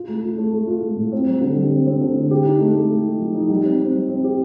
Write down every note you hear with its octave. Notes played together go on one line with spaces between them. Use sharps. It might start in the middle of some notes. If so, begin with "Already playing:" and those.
Already playing: F4
A3
F4
A3
A3
F4
A3
A2
C4
G3
D3
G3
C4
C4
D3
D3
G4
D#4
A3
A3
A3
D#4
F3
D#4
G3
C4
C4
G3
C4
G4